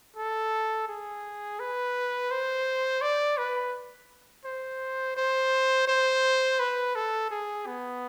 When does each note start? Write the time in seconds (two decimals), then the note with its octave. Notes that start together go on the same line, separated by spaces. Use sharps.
0.16 A4
0.88 G#4
1.60 B4
2.31 C5
3.02 D5
3.38 B4
4.45 C5
5.17 C5
5.88 C5
6.60 B4
6.95 A4
7.31 G#4
7.67 B3